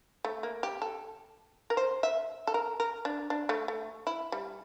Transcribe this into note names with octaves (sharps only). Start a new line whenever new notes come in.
A3
A#3
G4
A4
A#4
C5
E5
A4
A#4
A#4
D4
D4
A3
A3
E4
G3